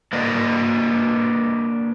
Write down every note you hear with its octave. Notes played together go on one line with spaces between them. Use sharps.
A#3 D4 B4 D5 D#5